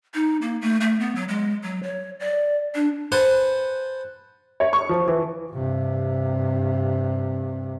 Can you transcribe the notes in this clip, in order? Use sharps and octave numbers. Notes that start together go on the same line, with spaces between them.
D#4
A#3
A3
A3
B3
F#3
G#3
F#3
C#5
D5
D4
B4 C5 F#5 G#5 A5 C6
C#5
C#6
F3
E3
G2 C3